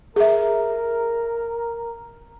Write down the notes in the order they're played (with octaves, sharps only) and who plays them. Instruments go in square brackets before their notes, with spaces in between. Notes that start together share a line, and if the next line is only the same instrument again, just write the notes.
[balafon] G#4 E5 [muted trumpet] A#4